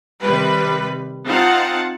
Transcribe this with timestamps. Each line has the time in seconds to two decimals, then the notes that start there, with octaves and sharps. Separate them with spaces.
0.22 C3 D#3 G3 B4
1.26 C4 D#4 F4 F5 F#5 A5